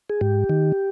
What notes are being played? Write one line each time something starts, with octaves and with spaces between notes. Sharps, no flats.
G#4
G#2 G4
D#3